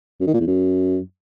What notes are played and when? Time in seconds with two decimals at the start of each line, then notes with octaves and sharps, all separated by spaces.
0.20 F#2
0.27 D#3
0.34 A#2
0.40 E2
0.47 F#2